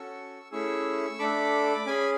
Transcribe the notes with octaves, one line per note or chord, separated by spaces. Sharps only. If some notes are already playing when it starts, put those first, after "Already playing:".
Already playing: C#4 F#4 A4 C#6 E6
A3 C#4 E4 G#4 C#6 E6
A3 D4 A4 B5 D6
C#4 G#4 G#5 B5